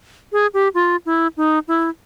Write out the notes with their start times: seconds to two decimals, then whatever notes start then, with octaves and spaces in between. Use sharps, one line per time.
0.32 G#4
0.54 G4
0.74 F4
1.06 E4
1.37 D#4
1.68 E4